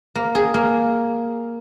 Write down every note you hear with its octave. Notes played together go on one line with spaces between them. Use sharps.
A#3
G#4
A#3